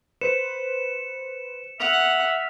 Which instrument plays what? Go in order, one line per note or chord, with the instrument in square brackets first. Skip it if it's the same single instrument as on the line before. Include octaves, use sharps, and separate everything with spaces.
[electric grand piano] B4 C5 [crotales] C#7 E7
[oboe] E5 [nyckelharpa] F#5 [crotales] F6 F7